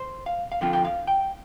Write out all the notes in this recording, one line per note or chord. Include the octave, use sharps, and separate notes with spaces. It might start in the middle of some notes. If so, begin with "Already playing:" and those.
Already playing: C5
F5
F5
D3 F3 C4 F4 G5
G5
F5
G5